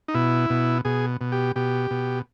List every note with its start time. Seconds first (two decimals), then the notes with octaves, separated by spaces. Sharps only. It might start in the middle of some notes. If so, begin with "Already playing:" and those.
0.08 D#4
0.14 B2 E4
0.50 B2
0.85 B2 G#4
1.21 B2
1.32 G4
1.56 B2 G4
1.91 B2